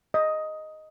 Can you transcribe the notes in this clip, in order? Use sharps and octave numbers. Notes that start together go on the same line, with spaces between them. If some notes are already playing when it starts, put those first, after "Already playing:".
D#5